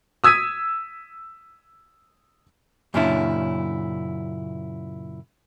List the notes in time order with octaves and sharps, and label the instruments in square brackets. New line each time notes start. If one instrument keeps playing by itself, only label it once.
[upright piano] D#6 E6 G#6 B6 D#7
[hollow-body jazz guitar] F#2 A#2 C#3 C#4 D4 E4